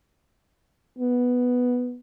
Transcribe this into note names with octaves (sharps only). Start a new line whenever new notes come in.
B3